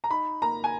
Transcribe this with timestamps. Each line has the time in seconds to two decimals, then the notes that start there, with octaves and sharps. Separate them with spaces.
0.04 A#5
0.10 D#4 B5
0.42 A#3 A#5
0.64 G#5